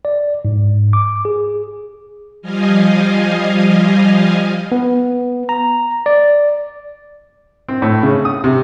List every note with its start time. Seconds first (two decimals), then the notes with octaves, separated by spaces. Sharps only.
0.05 D5
0.45 G#2
0.93 D6
1.25 G#4
2.42 F3 G3 D#5 F5 G#5
4.72 B3
5.49 A#5
6.06 D5
7.68 C4
7.82 A2
8.03 C#3
8.25 D#6
8.44 C3